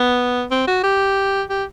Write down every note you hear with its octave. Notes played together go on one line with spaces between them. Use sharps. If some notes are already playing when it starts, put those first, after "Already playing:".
Already playing: B3
C4
F#4
G4
G4